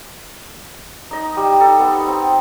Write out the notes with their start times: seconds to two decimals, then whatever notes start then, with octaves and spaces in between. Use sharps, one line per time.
1.11 D#4 D#5
1.36 G3
1.60 D#4 A4
1.79 B3
2.07 C4